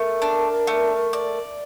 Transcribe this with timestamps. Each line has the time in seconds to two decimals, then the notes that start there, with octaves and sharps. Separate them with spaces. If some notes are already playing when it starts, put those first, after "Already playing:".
Already playing: A3 A#4
0.22 D4
0.67 A3
1.13 D5